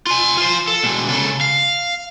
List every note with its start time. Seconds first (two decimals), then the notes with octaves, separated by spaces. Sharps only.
0.07 F4 G#5
0.37 F4 C5
0.68 A4
0.83 B2 G#3
1.09 C#3 A4
1.41 F5